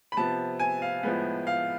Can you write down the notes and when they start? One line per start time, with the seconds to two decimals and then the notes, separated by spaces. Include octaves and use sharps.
0.12 B5
0.17 C3 F3 B3 A5
0.59 G#5
0.82 F5
1.03 A2 F3 G#3 B3
1.47 F5